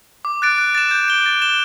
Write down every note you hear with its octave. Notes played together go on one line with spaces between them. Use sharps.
D6
F#6 A6 D7
F#6
A6 E7
G6
D7 G7
A6
E7 G7